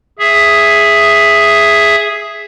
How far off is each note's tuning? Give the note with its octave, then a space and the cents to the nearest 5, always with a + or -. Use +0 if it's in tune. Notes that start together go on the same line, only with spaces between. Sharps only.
G#4 +0 E5 +5